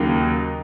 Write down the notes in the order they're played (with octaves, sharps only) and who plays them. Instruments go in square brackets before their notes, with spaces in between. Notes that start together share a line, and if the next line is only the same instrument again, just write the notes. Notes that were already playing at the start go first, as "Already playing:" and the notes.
Already playing: [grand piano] D#2 C#3 F#3 A#3 D#4